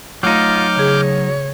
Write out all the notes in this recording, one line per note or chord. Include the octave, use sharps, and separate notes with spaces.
F#3 A3 D#4 F4 D6 F6 G6
C#3 G#4 C#5